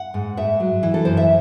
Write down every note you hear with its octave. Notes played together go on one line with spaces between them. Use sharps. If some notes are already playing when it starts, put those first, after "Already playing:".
Already playing: F#5
G#2
G#2 E5
F#3
E3
A4
F#2 C5
E5